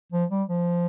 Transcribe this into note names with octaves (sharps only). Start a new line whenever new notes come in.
F3
G3
F3